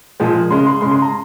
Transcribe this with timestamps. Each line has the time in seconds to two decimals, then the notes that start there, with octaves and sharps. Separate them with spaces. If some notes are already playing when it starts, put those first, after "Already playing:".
0.20 A#2 F3 G#3
0.50 C#3 G#3 C6
0.66 C6
0.81 C#3 G#3 C6
0.91 C6
1.02 A#5